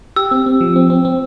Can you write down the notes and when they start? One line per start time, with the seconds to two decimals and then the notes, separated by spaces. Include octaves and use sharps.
0.16 G4 E6
0.31 C4
0.46 C4
0.61 F3
0.76 C4
0.90 C4
1.05 C4